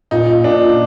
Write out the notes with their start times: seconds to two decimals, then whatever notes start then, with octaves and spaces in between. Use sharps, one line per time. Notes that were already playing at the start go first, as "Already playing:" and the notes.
0.11 A#2 D#4
0.44 A#2 D4